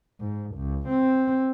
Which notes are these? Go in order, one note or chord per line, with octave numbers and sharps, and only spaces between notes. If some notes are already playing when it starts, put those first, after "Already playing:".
G#2
C#2
C4